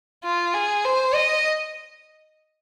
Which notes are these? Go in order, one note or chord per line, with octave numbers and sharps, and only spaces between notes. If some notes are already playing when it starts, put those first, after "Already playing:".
F4
G#4
C5
D#5